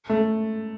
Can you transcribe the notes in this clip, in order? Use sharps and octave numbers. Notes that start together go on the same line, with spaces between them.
A3